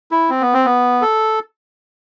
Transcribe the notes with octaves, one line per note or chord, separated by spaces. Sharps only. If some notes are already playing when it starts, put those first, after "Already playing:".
E4
C4
B3
C4
B3
A4